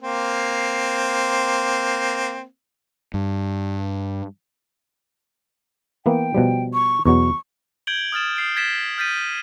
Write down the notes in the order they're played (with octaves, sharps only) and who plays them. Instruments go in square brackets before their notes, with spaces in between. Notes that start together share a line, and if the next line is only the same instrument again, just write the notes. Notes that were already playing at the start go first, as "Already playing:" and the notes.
[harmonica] A#3 C4
[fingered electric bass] G2
[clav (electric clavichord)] E3 A#3 B3 [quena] G5
[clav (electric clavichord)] B2 F3 G3
[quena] C#6
[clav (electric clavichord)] E2 B2 F#3 [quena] C#6
[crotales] G6 G#6 D7 F#7 G7
D#6 F6 A6 E7
D#6 C7 D7
G#6 A6 B6 D7 E7
F6 G6 A6 B6 D#7